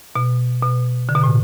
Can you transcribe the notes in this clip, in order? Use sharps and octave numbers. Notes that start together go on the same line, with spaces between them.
B2
B2
D3
B2
A2